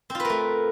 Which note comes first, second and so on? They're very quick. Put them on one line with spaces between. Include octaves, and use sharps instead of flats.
C4 F4 B4 A#4 A3